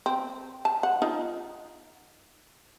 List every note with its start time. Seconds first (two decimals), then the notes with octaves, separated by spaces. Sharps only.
0.06 C4
0.65 A5
0.83 F#5
1.02 D#4 F4